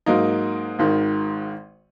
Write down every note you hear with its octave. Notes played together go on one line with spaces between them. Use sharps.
G#2 F#3 A#3 D#4
G#1 G#2 D#3